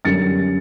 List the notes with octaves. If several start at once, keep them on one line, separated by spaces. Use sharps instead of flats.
F#2 D3 G3 C#4 A6 C#7